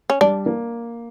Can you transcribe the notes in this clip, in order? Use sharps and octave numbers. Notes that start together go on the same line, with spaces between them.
C#4
G3 D4
A#3